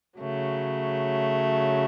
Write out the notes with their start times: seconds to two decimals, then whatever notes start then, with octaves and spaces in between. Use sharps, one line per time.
0.19 C#3 F#3 A3